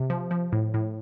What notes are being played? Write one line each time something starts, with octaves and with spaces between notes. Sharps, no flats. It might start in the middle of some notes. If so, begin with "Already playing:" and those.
Already playing: C3
F3
F3
A2
A2